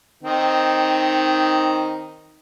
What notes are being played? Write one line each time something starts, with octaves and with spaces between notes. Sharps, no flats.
D#3 C4 D#4